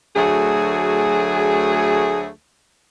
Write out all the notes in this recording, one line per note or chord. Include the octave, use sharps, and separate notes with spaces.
D2 F#3 A3 G#4